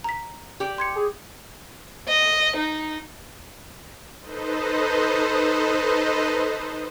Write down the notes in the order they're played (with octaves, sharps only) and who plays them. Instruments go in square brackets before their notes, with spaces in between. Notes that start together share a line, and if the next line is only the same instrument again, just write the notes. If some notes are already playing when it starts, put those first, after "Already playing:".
[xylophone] A#5 B6
[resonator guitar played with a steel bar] G4 D5
[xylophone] C6 G#6 C#7
[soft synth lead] G#4
[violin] D#5
D#4
[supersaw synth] D#4 A4 B4 C5 D#5